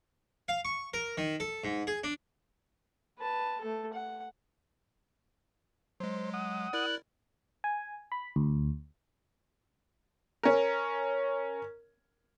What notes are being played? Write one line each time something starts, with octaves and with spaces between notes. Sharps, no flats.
F5
C#6
A#4
D#3
A4
G#2
G#4
D4
B4 A5
A3 A4
F#5
F#3 G#3 C5
F#5 D#6
E4 A#4 D5 F#6
G#5
B5
D2
C#4 A#4